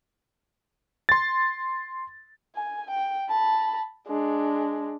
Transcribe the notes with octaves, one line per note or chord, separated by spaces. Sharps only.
C6 A6
G#5
G5
A5 B5
G#3 D4